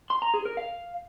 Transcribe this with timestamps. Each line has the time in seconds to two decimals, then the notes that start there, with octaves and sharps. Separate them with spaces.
0.10 C6
0.22 A#5
0.34 G#4
0.45 A#4
0.57 F5